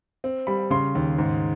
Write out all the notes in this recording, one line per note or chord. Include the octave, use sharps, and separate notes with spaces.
C4
G3 B5
C#3 C6
D#2
G#2